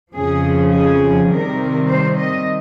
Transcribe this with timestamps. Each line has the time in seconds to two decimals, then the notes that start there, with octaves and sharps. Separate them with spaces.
0.13 F2 C#3 F3 G#4
0.71 G#4
1.29 C3 D#3 G3 C4 A#4
1.87 C5
2.15 D#5